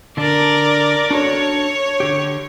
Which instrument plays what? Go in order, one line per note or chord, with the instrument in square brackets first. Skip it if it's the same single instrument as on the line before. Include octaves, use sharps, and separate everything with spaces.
[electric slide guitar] D3 D4 [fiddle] A#4 D5
[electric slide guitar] D4 F#4 A4 [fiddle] C#5
[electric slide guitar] D3 G4